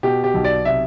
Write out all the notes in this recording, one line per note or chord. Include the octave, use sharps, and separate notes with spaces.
B2 G4
G4
B1
D5
C3 E5